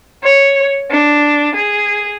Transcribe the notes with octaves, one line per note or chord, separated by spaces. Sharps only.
C#5
D4
G#4